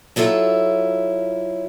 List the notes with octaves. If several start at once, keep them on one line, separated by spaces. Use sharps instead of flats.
F#3 E4 F4 A4 C#5